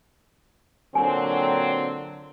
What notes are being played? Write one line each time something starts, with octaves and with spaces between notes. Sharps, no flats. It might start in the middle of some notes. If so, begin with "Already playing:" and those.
A#2 D3 F#3 C4 G#5